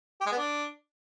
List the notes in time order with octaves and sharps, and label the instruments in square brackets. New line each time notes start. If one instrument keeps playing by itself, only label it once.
[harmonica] G4
G#3
B3
D4